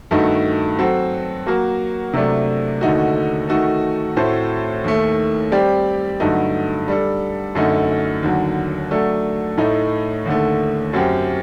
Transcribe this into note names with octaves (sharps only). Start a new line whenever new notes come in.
G2 D#3 A3 D#4 F#4
F#3 C4 F#4 A4
F#3 A#3 F#4 A#4
C3 F#3 A3 D4
D#2 D3 A3 D#4 F#4
D#3 A3 D#4 F#4 A4
A2 A3 C4 F#4 C5
D#2 D#3 A3
G3 C4 G4 D5
G2 D3 F#3 A3 D#4
G3 D4 A4
F#2 D3 A3 D#4
D#2 D3 F#3
F#3 A3 D4 A4
A2 A3 D#4
D#2 D3 A3
F#2 F#3 C4 G4